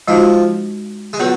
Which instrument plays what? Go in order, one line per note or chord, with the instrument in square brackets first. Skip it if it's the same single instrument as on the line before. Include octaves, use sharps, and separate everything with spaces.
[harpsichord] F3 [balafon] G#3 D#4 F#4
[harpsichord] G#3
[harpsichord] F#3 [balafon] B3 F4 G#4 B4